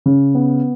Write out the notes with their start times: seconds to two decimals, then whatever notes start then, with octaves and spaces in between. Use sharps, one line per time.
0.06 C#3
0.35 B3